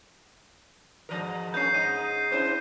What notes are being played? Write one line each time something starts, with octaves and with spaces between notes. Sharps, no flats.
G#2 F3 A#4
A#3 C#4 G6 C7
G#2 D#4 D#7
C#4 E4 C5